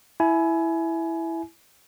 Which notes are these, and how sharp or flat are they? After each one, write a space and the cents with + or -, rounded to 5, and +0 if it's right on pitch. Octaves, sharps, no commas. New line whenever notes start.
E4 +0 G#5 +25